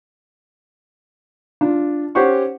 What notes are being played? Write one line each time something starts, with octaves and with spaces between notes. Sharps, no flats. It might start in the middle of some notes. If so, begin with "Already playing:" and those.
D4 F4
C#4 G4 C5 C#5 F#5 C#6